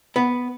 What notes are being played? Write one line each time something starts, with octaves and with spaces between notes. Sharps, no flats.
B3